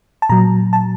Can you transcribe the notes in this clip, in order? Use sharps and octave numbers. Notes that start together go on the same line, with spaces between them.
A5
A#2 F#3 A#5
A5